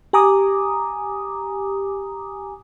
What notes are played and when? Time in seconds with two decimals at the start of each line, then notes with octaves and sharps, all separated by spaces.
0.13 G4 G#5 A#5 D6 D#6